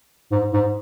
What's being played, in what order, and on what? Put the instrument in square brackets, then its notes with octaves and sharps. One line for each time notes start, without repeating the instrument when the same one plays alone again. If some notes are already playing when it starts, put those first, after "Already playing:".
[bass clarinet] G#2
G#2